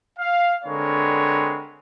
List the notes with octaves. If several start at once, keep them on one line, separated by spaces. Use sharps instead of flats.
F5
D3 G#3 C4 A#4 B4 C#5